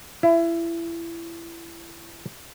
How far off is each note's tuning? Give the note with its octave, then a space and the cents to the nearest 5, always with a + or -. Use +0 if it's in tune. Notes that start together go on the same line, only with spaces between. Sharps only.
E4 +25